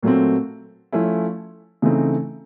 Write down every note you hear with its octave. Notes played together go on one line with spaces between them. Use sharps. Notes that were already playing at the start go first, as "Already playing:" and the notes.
A#2 F#3 A3 C4
F3 A3 C#4 E4
C#3 E3 A3 C4 D#4